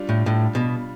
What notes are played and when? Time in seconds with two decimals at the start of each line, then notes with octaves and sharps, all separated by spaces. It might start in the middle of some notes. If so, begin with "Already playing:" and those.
Already playing: G3 D4 F4
0.09 A2
0.26 A2
0.55 B2